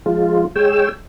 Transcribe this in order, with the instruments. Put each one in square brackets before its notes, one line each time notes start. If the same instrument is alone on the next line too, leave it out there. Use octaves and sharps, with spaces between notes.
[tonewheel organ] F3 G#3 F4
G#3 G#4 C#5 G5 E6